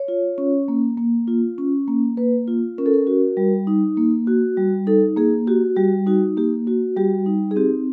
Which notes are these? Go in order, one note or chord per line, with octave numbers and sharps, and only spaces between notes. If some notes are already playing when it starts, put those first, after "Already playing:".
Already playing: C#5
F4
C#4
A#3
A#3
F4
C#4
A#3
A#3 B4
F4
C#4 A#4
A4
A#4
F#4
G3
D#4
A#3
F#4
G3
D#4 A4
A#3 G#4
F#4 G4
G3 G4
D#4 F#4
A#3 G4
F#4
G3 G4
D#4
G#4
C4 G4